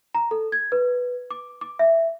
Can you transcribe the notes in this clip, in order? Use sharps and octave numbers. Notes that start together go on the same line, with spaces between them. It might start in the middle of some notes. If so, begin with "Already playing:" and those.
A#5
A4
G#6
B4
D6
D6
E5